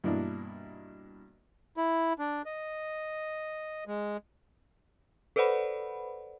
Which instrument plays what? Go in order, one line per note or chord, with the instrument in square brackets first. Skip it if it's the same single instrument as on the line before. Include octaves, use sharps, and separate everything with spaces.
[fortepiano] G2 B2 E3 A#3 D4 E4
[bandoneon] E4
D4
D#5
G#3
[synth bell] A4 B4 C5 D5 F#5 B5